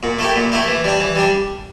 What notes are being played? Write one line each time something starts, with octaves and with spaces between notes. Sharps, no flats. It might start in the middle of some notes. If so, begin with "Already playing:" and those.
A#2
A3 E4 G4
A#2
A3 E4 G4
E3
G3 D4
E3
G3 D4